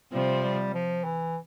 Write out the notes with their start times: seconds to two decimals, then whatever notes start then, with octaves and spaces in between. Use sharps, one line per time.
0.12 C3 F3 G3 C4
0.43 G3
0.74 F3
1.05 E3